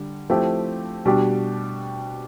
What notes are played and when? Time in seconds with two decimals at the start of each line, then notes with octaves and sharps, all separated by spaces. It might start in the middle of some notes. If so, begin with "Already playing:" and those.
Already playing: D3 G3 D4
0.30 F3 A3 C4 E4 G4
1.05 B2 G3 D4 G4